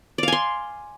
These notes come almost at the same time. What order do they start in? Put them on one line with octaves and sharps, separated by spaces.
D5 F5 G#5 C6